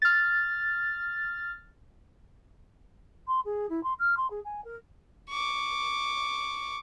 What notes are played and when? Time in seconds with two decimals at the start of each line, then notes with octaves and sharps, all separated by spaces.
0.02 F6 A6
3.27 C6
3.45 G#4
3.69 E4
3.83 C6
3.99 F6
4.17 C6
4.30 G#4
4.44 G#5
4.64 A#4
5.30 C#6 D6